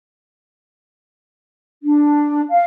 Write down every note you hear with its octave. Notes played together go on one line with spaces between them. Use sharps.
D4
F5